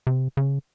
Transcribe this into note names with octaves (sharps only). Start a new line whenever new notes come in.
C3
C#3